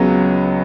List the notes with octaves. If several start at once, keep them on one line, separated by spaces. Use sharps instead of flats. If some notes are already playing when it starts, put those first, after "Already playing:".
Already playing: C#2 C#3 F#3 B3